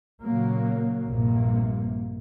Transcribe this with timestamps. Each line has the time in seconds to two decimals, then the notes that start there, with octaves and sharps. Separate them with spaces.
0.22 A#2 C#3 F#3 A#3
1.06 A#1 G2 C3 A#3